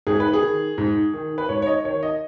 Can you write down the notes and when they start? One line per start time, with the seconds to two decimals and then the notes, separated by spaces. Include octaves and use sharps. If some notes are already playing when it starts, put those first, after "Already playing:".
0.07 G#2 G#4
0.20 B4
0.33 G#4
0.42 D#3
0.78 G#2
1.14 D#3
1.38 B4
1.48 G#2 C#5
1.62 C#5
1.67 D#5
1.85 D#3 C#5
2.03 D#5